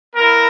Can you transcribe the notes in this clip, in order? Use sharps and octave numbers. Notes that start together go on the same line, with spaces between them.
B3 E4 A#4